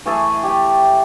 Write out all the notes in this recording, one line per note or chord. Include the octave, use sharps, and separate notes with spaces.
E3 A3 G#4 A4
G4 G5